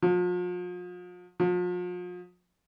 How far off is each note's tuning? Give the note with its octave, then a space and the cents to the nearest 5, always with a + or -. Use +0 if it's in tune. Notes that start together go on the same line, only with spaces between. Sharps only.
F3 +40
F3 +40